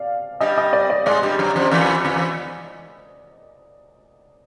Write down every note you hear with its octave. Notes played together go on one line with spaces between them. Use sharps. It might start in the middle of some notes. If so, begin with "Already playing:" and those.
Already playing: D5 F5
G2 G3 D#5
D#5
D5
D5
G#2 G#3 D5
G2 G3
F#2 F#3
F2 F3
E2 E3
E2 E3